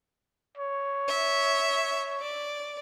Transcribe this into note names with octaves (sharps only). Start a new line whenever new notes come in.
C#5
E5
D5